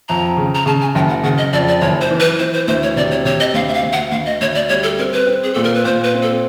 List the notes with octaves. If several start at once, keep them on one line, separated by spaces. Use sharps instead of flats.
F2 A#5
C#3
A#5
C#3 A5
G#5
F#1 G5
F#5
C#3 F#5
D#5
F2 D5
D5
F#1 C#5
C5
E3
B4
E3 C5
C5
D2 C5
C#5
C3 D5
C#5
C3 C#5
D#5
D2 F5
E5
F5
D2
F#5
D2 F5
D#5
D2 C#5
D5
G3 C#5
A4
C4 A#4
B4
C4
G#4
A#2 A4
A#4
B4
A#2 C5
B4
C4
A4